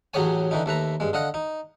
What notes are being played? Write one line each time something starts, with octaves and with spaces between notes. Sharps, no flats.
A1 F#3 G4 G#4 C#5 G#5
D3 E3 D#4
D#2 A3 B4 A#5
G2 G#3
D3 D#5 F5 F#5
D#4